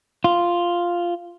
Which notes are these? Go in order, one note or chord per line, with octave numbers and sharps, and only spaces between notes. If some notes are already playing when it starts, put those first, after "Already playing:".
F4